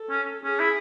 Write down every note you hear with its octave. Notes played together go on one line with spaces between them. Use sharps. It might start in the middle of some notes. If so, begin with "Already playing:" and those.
Already playing: A4
C#4
C#4 G#4
E4